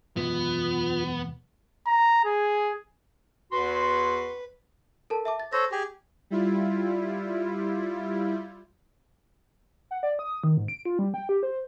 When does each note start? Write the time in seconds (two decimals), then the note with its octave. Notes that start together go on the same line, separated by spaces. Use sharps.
0.17 E1 F#2 B3 F4
1.87 A#5
2.25 G#4
3.52 E2 F#4 B4 C6
5.10 A4 A#4 A5
5.25 E5 A5 D6
5.40 A6
5.53 A4 C5 C#5 A#6
5.72 G4 G#4
6.30 G3 E4 F4
9.91 F#5
10.03 D5
10.19 D#6
10.44 D#3
10.57 G#2
10.68 D7
10.85 F4
10.99 G3
11.14 G5
11.29 G4
11.43 C5